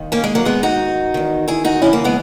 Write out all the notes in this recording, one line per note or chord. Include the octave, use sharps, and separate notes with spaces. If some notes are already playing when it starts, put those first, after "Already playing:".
Already playing: D#2 D#3
A#3 C#4
G#3
F#3 A#3
G#2 D#3 G#3 B3
D#4 F#4
E2 D#3
E4 G#4
D#4 F#4
D#2 C#3 E3 C#4 E4
A#3 C#4
G#3 B3